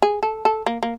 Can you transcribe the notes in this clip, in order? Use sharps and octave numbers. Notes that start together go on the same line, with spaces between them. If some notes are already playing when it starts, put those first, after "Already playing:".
G#4
A4
A4
A#3
A#3